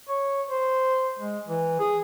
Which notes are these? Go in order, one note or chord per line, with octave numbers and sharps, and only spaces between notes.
C#5
C5
G#3
E3
G#4